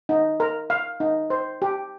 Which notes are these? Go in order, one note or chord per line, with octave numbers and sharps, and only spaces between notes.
D#4
A#4
F5
D#4
C5
G4